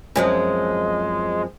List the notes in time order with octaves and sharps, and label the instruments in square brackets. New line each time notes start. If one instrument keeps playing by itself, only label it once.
[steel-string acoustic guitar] F#2 F3 C4 [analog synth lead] G#3